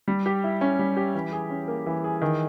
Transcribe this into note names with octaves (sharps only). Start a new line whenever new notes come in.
G3
G4
E4
C#4
G3
G4
E3
G#4
C#4
A#3
E3
G#4
D#3